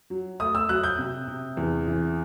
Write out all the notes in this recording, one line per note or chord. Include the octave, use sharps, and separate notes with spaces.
F#3
A3 D#6
E6
F#3 F#6
G6
C3
C3
E2
E3